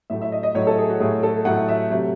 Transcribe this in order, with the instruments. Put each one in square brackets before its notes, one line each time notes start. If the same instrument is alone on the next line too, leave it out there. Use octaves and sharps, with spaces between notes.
[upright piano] A2 F#3 A3 E5
E5
D#5
D#5
A2 F#3 A3 C#5
A4
G#4
F#4
A2 F#3 A3 G#4
A4
A2 F#3 A3 F#5
E5
C3 F#3 A3